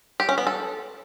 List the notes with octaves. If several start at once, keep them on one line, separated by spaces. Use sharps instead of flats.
G4
C#4
B3
A4